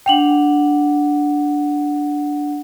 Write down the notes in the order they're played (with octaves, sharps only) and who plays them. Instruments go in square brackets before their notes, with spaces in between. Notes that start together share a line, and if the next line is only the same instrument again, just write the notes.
[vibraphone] D4 F#5 [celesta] G5 F7 F#7